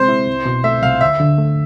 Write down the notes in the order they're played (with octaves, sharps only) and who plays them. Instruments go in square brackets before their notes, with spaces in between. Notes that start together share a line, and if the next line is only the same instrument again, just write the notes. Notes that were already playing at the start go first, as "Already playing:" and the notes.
Already playing: [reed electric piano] C3 G#3 C4 [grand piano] C5
[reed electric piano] E4
C2
B2
[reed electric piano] A3 [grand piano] E5
[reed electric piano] C2 [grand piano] F5
[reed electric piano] D2 [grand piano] E5
[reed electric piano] D3
A3